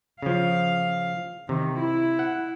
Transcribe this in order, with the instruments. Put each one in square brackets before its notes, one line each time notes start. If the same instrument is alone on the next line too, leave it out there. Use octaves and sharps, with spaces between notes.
[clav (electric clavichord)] C#3 F3 [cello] F5
[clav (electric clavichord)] C3 [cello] D#3
[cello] E4
[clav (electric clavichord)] F#5